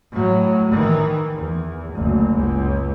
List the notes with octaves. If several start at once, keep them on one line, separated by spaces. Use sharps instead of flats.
A2 F#3
D#3 E3
E2
F#1 D2
C#2